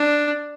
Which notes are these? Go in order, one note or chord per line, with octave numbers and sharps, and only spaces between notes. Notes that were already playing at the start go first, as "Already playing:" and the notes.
Already playing: D4